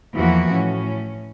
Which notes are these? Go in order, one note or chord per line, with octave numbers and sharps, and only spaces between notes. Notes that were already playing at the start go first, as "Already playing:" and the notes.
E2 E3 F3 A#3 F#4
A2 C#4